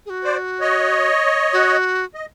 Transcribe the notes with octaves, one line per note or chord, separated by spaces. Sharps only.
G#4
F#4
C5 D5
C#5 D#5
F#4
D#5